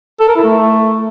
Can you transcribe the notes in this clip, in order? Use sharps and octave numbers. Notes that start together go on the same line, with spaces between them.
A4
A#4
E4
A3